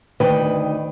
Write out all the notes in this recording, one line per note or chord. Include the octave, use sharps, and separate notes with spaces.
D2 D#3 B4 G5